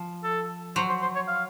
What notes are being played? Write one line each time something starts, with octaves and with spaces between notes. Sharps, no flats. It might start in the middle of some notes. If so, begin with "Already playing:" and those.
Already playing: F3
A4
F#3 C5
C5
C5
C#5
F5